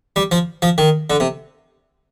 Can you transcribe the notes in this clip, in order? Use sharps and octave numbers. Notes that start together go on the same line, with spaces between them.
G3
F3
F3
D#3
D3
C3